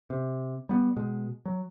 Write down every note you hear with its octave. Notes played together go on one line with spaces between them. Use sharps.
C3
G3 B3
B2 G#3
F#3